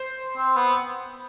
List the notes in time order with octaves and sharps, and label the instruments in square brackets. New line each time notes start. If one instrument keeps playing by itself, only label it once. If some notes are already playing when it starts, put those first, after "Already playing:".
Already playing: [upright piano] C5
[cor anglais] C4
B3